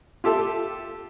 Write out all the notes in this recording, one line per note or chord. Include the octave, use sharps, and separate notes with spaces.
F4 G4 A4 E5